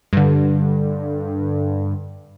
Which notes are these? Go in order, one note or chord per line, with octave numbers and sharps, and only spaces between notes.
G2 D3